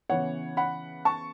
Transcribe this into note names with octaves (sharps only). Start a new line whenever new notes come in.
C#3 E3 B3 C#5 F#5
F#5 B5
A5 C#6